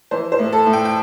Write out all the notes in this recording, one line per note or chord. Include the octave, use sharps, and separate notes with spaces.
E3 C5
C5
A2
A4
A2
G5
G5